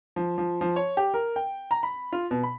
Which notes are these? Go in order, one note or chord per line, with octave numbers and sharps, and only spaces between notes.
F3
F3
F3
C#5
G4
A#4
G5
A#5
B5
F4
B2
B5